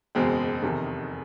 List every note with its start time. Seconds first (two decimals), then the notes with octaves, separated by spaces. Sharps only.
0.15 F#1 E2 B2 G#3 C4
0.62 F1 E2 C3 D#3